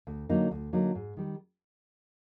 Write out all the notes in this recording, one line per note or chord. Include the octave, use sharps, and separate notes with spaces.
D2
D3 F#3 A#3 D#4
D2
D3 F#3 A#3 D#4
G#2
D#3 G3